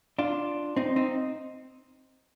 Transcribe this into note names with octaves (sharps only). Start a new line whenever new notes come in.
D4 F4
C4 D#4
C4 D#4